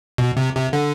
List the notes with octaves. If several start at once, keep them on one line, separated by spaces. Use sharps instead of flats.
B2
C3
C3
D3